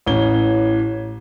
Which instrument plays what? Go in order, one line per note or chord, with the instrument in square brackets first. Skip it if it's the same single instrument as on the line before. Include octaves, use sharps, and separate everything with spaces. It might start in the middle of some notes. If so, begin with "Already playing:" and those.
[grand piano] A1 E3 C#4 G7